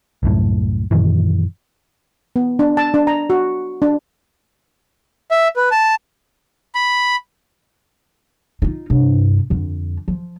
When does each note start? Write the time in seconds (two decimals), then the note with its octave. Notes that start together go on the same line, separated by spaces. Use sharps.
0.23 C2 F#2 A2
0.91 F#2 A#2 D#3 E3
2.36 B3
2.59 D4
2.77 A5
2.94 D4
3.07 A#5
3.30 F#4
3.82 D4
5.31 E5
5.56 B4
5.71 A5
6.75 B5
8.62 D#4 F4
8.90 G2 C3
9.50 F2 D3
10.08 F3